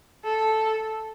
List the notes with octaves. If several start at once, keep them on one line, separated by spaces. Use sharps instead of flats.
A4